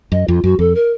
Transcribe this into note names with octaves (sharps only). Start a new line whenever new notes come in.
F#2 D#5
F2 F4
F#2 F#4
F2 A4
A#4